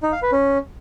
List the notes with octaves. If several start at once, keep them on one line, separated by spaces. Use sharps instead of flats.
D#4
F5
B4
C#4